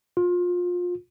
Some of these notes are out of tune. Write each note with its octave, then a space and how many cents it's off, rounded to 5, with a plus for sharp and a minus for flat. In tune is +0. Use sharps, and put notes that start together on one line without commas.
F4 +25